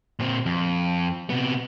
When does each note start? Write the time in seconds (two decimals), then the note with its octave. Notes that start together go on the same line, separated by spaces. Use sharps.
0.20 A#2 C4
0.46 F2
1.30 C3 B3